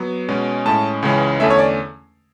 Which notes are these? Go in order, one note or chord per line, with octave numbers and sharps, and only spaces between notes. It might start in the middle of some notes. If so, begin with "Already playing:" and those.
Already playing: F#3 B3
B2 G#3 C#4
A2 G#3 C#4 A5
C#2 C#3 E3 G#3 C#4
E2 D3 A3 C#4 E5
C#5
D5